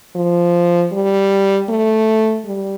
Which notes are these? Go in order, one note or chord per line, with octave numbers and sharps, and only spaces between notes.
F3
G3
A3
G3